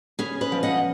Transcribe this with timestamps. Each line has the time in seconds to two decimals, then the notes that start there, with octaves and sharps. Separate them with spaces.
0.19 C#4 G#4 B4
0.41 B4 D#5
0.52 F3
0.63 D#5 F#5